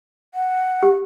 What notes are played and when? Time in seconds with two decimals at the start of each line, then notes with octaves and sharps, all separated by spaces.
0.34 F#5
0.83 G4